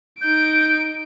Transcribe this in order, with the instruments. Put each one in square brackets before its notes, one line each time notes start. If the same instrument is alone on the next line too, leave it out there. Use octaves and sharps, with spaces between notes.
[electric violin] D#4 D7 [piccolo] G6